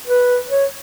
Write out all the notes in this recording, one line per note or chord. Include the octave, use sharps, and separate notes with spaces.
B4
C#5